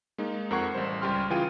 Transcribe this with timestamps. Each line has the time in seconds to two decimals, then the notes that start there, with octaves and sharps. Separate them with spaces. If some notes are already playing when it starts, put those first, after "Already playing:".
0.18 G#3 A#3 D#4
0.51 F2 A#4 F#5 C#6 G#6 C7
0.74 A1 G3 C5
1.01 C#2 G3 G4 C6 F6
1.30 C#3 E3 F4 G#4 G5 D#7